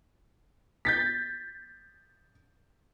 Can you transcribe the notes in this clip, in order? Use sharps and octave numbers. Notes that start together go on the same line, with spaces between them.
G6 A6 B6